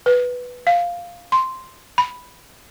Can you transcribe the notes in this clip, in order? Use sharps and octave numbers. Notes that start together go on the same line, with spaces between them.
B4
F5
C6
B5